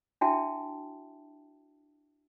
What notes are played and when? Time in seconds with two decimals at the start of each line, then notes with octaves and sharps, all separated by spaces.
0.21 D4 E4 F#4 E5 G5 A5